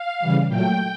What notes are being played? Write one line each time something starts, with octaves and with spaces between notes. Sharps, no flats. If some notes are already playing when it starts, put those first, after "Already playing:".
Already playing: F5
C#3 E3 G3
A#2 F#3 A3 G5